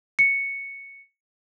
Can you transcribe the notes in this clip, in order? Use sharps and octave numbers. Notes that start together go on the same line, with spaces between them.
C#7